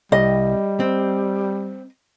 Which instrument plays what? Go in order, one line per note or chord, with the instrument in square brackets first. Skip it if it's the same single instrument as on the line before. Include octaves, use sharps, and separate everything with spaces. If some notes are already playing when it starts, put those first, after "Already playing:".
[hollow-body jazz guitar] C2 [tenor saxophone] G3 [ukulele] D#5
[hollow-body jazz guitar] C4